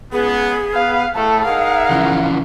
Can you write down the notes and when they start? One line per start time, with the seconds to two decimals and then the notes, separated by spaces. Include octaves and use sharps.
0.13 C#2 B3 G#4
0.74 B3 B4 F5
1.15 A2 A3 A4
1.45 D#4 G#4 A#4 F5 F#5
1.91 C#3 E3 F3